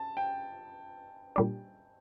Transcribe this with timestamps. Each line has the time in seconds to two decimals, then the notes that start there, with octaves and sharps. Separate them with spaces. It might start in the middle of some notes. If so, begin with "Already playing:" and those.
Already playing: A5
0.17 G5
1.36 A#2 G3 D4